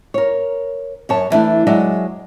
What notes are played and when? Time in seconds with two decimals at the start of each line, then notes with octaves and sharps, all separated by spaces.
0.14 A#4 C#5
1.09 F#2 C#5 A5
1.30 D3 E3 A3 D4
1.67 F#3 G#3 D5 E5